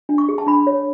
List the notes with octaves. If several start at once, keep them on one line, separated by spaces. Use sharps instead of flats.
D4
C#6
G#4
A5
D4 B5
C#5